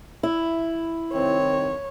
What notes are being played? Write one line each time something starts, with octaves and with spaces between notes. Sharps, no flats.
E4
C2 D#3 C4 C#5